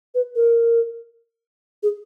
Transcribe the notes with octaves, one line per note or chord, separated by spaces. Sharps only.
B4
A#4
G#4